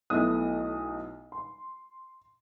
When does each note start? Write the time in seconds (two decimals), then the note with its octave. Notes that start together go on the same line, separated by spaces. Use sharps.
0.10 B1 B2 A3 E4 D#6
1.32 C6